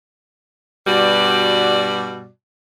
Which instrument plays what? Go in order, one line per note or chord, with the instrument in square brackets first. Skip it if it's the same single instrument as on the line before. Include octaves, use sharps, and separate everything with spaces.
[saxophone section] G2 B2 G3 F#4 D5